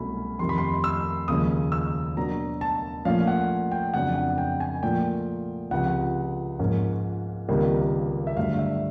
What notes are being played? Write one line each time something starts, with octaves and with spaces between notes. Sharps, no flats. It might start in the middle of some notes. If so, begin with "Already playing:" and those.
Already playing: C2 B2 F#3 A3 C#4 B5
F2 C3 D#3 C6
B5
C6
E6
D#2 C#3 F3 G#3 C#4 D#6
E6
B2 F#3 A#3 D4 A#5
A5
A#2 F3 A3 C#4 F5
F#5
G5
F2 C#3 F#3 B3 D4 F#5
F#5
G5
G#5
A#2 F3 A3 G5
C#2 C3 F3 F#5
G#2 F3 A#3 C#4
C#2 C3 D#3 G3 A#3
E5
G2 D3 F#3 A3 F5
E5